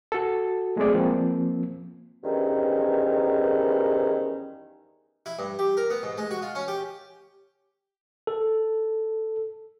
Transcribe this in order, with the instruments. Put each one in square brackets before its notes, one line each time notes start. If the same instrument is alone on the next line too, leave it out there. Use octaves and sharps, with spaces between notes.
[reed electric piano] F#4 A4
F#3 G#3 A3 C4 G#4 D5
F3 A#3 C4
[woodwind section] E2 G2 D#3 F3 C#4 D#4
[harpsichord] E4
G2
G4
A#4
B3
G#2
G#3
F#4
F4
C#4
G4
[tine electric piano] A4